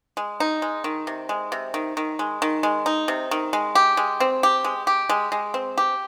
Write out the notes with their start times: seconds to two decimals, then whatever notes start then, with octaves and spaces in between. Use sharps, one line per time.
0.17 G#3
0.40 D#4
0.62 G#3
0.84 D#3
1.07 C3
1.29 G#3
1.52 C3
1.74 D#3
1.97 D#3
2.19 G#3
2.42 D#3
2.63 G#3
2.86 D#4
3.08 C3
3.31 D#3
3.53 G#3
3.75 G4
3.97 G#3
4.20 C4
4.43 G4
4.64 G#3
4.87 G4
5.09 G#3
5.32 G#3
5.54 C4
5.78 G4